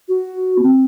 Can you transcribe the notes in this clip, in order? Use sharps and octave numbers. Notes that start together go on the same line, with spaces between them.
F#4
B3
C4